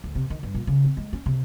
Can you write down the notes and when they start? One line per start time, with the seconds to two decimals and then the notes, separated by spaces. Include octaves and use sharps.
0.04 D2
0.15 C3
0.30 D#3
0.43 G2
0.55 A#2
0.67 C#3
0.85 C4
0.97 G#3
1.13 C#4
1.26 C3